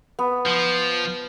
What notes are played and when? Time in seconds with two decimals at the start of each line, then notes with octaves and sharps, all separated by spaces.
0.19 B3
0.46 F3